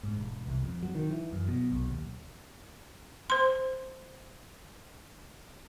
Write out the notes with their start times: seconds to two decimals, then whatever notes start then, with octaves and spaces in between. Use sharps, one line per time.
0.03 G#2
0.17 E1
0.47 C2
0.63 F2
0.83 F#3
0.95 D#3
1.11 E3
1.33 F#2
1.48 B2
1.72 B1
1.88 D#2
3.30 C5 C6